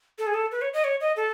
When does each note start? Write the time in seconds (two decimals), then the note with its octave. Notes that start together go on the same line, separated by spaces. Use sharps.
0.18 A4
0.27 G#4
0.34 A4
0.52 B4
0.61 C#5
0.73 D#5
0.84 C#5
1.01 D#5
1.16 A4